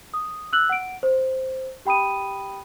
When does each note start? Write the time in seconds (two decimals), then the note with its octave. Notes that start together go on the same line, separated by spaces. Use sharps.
0.14 D#6
0.53 E6 F#6 F#7
0.69 F#5 D7
1.03 C5
1.85 G4 G5 B5 D#6 D#7